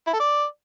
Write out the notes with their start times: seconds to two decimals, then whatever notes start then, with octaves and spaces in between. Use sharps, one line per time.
0.07 E4
0.13 A4
0.20 D5